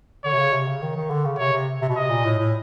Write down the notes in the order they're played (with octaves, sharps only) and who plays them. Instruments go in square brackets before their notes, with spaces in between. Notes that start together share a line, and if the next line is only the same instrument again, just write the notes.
[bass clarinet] D3 [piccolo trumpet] C#5
[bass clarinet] C3
C#3
C3
C#3
D#3
D#3
D3
C#3
[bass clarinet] C3 [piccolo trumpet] C#5
[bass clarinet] C3
C3
B2
[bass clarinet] C3 [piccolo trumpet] D#5
[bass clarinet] A#2
A2
A2